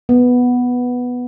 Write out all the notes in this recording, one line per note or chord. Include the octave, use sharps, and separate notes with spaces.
B3